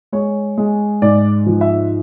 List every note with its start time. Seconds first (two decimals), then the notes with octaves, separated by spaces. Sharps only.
0.12 G#3 C#5
0.58 G#3
1.02 G#2 D5
1.46 F3
1.61 E5